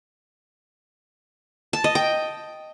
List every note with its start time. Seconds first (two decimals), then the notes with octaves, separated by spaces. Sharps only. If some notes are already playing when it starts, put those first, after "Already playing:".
1.73 A5
1.84 D#5
1.95 G5